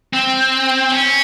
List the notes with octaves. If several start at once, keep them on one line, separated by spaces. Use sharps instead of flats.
C4
C#4